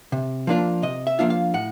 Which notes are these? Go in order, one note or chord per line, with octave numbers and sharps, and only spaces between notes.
C3
F3 A#3 D4 F4
C3 D#5
E5
F3 A#3 D4 F4
F5
A2 F#5